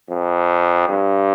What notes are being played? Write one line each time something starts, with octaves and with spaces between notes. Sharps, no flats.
F2
G2